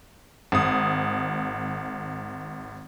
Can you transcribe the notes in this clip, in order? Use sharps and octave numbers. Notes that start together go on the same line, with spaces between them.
G#1 D#6